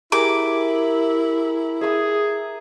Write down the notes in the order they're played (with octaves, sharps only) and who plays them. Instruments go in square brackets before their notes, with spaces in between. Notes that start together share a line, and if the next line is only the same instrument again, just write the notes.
[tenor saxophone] E4 [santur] G4 G#4 A#4 [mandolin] D6
[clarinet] G#4 [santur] E5 D#6